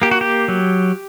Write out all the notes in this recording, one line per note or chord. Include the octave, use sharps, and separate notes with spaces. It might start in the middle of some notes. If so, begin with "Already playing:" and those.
A#3 G4
F#4
G4
F#3